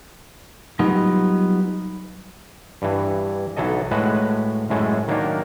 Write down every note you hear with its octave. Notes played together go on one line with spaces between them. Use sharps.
F#3 G3 B3 D#4 F4
G2 E3
B1 E3 F#3 A4 D#5
A2 G#3 F#4 B4
F#2 A2 G#3 A3
D#3 F#3 A#3 D4 D#4 A#4